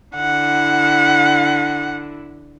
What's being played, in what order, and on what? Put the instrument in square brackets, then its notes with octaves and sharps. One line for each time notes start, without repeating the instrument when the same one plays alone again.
[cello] D3 E4 [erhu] F#5